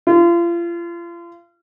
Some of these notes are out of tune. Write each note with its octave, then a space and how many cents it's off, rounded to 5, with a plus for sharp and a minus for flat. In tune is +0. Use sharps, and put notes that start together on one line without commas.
F4 -35